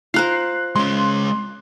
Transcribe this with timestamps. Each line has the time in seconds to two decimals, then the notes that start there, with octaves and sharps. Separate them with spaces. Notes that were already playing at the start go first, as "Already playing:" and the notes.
0.14 F4 A#4 C5 F#6 C7
0.76 G#3 C#4 C6